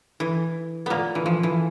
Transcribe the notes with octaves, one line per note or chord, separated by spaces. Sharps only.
E3
A#2 A#3 B3
E3
F3
E3